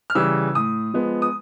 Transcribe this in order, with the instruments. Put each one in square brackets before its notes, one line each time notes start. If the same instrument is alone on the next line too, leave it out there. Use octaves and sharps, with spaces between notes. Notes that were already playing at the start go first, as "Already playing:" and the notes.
[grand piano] F6
C#3 E3 G3 E6
A2 D#6
F3 G#3 B3
D#6